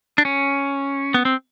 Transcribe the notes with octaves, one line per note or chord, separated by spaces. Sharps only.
D4
C#4
B3
C4